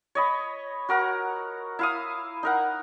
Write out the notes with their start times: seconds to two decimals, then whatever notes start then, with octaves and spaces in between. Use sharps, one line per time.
0.15 C#5 D#5 B5
0.89 F#4 A#4 F#5
1.79 E4 F5 D#6
2.43 D#4 A#4 F#5